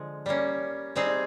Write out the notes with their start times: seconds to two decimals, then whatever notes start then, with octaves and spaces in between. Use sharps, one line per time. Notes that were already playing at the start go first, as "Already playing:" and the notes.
Already playing: D3 F3 G#3
0.26 G3 A#3 C#4
0.96 G3 C4 D#4 G#4